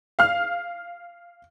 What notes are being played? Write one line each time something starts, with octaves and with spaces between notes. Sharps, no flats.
F5 F6